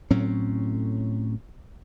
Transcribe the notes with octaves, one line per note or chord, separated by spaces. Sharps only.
A2 F#3 C4 C#4